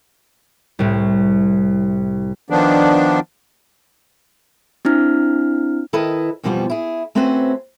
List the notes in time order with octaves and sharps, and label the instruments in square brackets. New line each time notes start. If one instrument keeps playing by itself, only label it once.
[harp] C2 A2
[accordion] D#3 F3 B3 D4
[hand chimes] C4 D4 E4 F6
[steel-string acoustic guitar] D#3 E4 A4 B4 D#5
F2 B2 E3 F3 G3 B3
E4 G#4
A3 C4 C#4 F#4 B4 C5